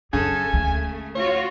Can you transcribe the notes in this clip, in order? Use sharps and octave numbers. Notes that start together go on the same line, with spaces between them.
F#2 C#3 A4 G#5
D2 A3
F4 F#4 C#5